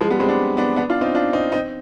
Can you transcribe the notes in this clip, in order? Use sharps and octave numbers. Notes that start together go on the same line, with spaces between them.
F3 G#3
G3 B3
G#3 C4
B3 D4
B3 D4
B3 D4
D4 F4
C4 D#4
D4 F4
C4 D#4
C4 D#4